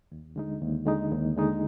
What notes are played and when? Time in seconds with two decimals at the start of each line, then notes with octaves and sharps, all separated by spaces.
0.12 D#2
0.36 D3 G#3 D#4
0.62 D#2
0.86 D3 G#3 D#4
1.11 D#2
1.37 D3 G#3 D#4